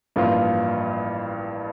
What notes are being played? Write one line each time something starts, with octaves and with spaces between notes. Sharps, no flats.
A1 G2 F3 A#3 F4